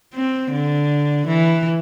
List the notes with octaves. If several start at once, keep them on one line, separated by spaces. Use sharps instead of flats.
C4
D3
E3